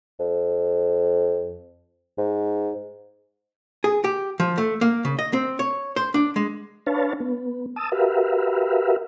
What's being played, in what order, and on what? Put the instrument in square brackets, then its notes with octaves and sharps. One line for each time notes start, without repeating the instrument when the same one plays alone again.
[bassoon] F2
G#2
[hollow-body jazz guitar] G#4
G4
F3
A3
A#3
C#3
D#5
C4
C#5
C5
D4
G#3
[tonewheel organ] D4 B4 C#5 F5 A5
B3
A5 D#6 E6
F#4 G4 A#4 B4 E5 F5